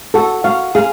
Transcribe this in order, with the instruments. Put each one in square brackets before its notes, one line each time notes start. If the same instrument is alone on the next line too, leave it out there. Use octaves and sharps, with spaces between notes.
[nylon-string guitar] F#4 [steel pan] A4
[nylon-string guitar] F#4 [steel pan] F5
[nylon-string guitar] G#4 [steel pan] F5